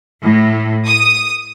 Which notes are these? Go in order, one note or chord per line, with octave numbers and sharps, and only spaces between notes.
A2
D#6